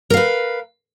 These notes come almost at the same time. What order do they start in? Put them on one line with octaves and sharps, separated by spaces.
A#4 F5 B4